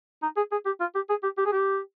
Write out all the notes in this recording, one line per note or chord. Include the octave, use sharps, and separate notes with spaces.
D#4
G#4
G#4
G4
F4
G4
G#4
G4
G4
G#4
G4